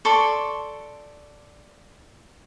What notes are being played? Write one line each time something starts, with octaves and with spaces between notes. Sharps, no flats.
A4 D5 C6 C#6